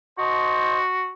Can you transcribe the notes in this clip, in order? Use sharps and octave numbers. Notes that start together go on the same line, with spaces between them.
F#4 C5 D#5 A5